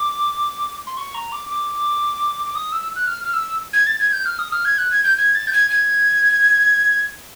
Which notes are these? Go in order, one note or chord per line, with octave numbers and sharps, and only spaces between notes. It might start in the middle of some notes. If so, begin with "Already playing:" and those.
Already playing: D6
C6
C#6
A#5
D6
D6
D6
D#6
E6
F#6
F6
F6
E6
G#6
A6
G#6
G6
F6
D#6
F6
G#6
F#6
G#6
G6
G#6
A6
G6
G#6
G#6